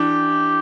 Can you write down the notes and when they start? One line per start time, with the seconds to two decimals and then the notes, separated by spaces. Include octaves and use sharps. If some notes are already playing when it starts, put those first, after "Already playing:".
Already playing: E3 D4 G4